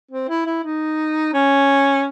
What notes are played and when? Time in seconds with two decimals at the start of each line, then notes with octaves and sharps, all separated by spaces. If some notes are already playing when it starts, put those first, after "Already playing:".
0.11 C4
0.29 E4
0.46 E4
0.64 D#4
1.33 C#4